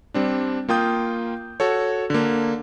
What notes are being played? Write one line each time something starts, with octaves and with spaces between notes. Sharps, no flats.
G3 C4 D4
A#3 F4 G5 D#6 G6
F#4 A4 C#5
D3 A#3